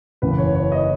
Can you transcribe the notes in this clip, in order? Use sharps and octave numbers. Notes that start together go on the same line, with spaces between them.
F#1 E2 C#3 B4
C#5
C#5
D#5